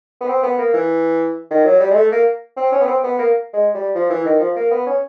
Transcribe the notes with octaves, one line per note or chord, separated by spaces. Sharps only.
B3
C4
B3
A#3
E3
D#3
F#3
G3
G#3
A3
A#3
C4
C#4
B3
C4
B3
A#3
G#3
G3
F3
E3
D#3
F3
A#3
B3
C#4